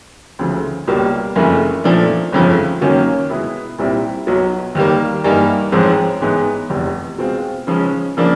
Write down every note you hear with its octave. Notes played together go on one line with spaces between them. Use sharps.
D2 C#3 F3 A3
C#2 B2 G3 A#3
F#1 F2 C#3 E3 A3
A#2 F3 A3 D4
G1 F2 C#3 F3 A3
F#2 D#3 F#3 A#3 C#4
B2 G#3 B3 E4 G#4
C2 A#2 G3 C4 E4
B1 B2 F#3
D#2 D#3 G3 A#3
G2 E3 G3 A#3 D#4
A1 G#2 F3 G#3 C4
A1 G#2 E3 G#3 B3
F1 E2 C3
B2 G#3 C4 F4
C#3 F3 G#3 C#4
C#3 F3 A#3 D4